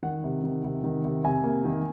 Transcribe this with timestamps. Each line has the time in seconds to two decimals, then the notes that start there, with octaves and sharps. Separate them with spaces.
0.02 D#3 F#5
0.24 C3
0.43 D#3
0.64 C3
0.84 D#3
1.04 C3
1.24 C3 G#5
1.44 A#3
1.65 D#3